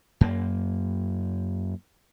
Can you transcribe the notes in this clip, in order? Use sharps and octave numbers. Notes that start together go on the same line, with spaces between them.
F#2 A#3